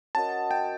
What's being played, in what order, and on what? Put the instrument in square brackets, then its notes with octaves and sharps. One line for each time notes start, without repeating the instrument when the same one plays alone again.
[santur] C#4 F#4 A#4 D#5 [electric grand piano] A5
[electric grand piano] G5